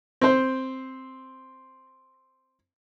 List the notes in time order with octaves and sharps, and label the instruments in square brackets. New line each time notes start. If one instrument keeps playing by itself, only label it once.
[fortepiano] C4 C5